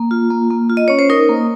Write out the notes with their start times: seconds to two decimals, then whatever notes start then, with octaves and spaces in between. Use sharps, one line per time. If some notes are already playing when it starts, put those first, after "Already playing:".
Already playing: A#3
0.11 F4
0.30 A#3
0.50 A#3
0.70 F4
0.77 D#5
0.88 C#4 C#5
0.99 C5
1.10 D#4 A#4
1.29 A#3